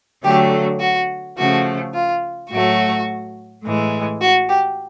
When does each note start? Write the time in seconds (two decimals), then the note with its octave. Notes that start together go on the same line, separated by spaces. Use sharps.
0.24 D3 F#3 A3 G4
0.80 F#4
1.38 C#3 F3 A3 F#4
1.94 F4
2.51 A2 F#3 A3 F#4
3.64 A2 E3 G#3
4.21 F#4
4.49 G4